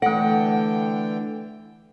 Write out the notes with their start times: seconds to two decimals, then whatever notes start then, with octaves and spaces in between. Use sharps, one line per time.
0.02 D3 E3 A3 A4 F#5 G5